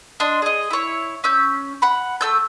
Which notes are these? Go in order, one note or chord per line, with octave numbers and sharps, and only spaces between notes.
D4 D#5 C6
G#4 D#5
E4 C#5
C#4 E6 G6
F#5 B5
A3 E6 G6